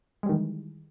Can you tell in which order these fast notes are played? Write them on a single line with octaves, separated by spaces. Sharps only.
G#3 G3 D#3 E3